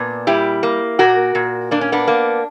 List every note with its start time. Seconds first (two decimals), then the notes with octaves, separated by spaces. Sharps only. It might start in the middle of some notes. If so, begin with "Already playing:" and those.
Already playing: A#2 B3 D4
0.27 G3 E4 G4
0.63 A#3
0.99 A#2 F#4 A#4
1.35 A#2
1.71 A#3 D4
1.81 C#4
1.92 B3 D4
2.08 A#3